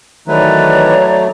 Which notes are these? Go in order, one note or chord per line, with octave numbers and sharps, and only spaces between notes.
D#3 E3 F#3 A3 B4 C#5 D5 A#5